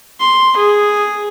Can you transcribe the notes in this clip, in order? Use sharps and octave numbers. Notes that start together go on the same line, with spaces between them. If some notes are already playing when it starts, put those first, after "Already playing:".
C6
G#4